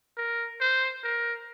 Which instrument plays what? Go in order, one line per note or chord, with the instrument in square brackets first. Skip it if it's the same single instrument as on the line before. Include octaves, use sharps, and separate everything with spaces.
[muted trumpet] A#4
C5
A#4